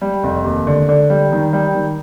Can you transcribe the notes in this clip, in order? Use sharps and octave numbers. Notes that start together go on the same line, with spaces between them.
G3
F1
D#2
D3
D3
G3
D#3
G3
D#3